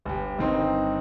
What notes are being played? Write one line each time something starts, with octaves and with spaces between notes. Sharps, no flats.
G1 G4
G1 G2 D#3 C4 D#4 C6